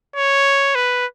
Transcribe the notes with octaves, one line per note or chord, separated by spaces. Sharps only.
C#5
B4